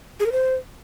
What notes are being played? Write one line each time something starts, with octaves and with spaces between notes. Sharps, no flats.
G#4
A#4
C5